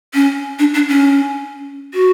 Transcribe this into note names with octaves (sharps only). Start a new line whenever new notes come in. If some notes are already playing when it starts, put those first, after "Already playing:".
C#4
D4
D4
C#4
F#4